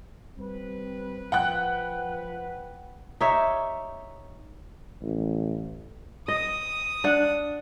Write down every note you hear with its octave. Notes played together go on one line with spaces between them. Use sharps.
G3 C4 B4
F3 B4 F#5 G5 F#6
D#4 G4 C#5 E5
A1
D#5 D#6
D4 F#5